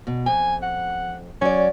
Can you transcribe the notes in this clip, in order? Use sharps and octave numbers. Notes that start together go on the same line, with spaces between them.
B2
F2 G#5
F#5
F#3 C#4 D5